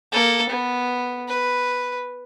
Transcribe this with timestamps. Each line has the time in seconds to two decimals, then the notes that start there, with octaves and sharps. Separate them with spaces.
0.12 A#3 A4
0.50 B3
1.28 B4